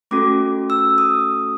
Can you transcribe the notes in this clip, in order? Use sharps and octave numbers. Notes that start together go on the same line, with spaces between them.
A3 C#4 F#4 A4 D6
E6
D#6